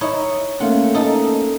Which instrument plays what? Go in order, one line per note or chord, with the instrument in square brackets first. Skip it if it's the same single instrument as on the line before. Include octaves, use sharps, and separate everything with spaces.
[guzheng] D#4 E4 C#5
[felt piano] A3 A#3 C#4 [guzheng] F4 F#5
[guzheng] D#4 A4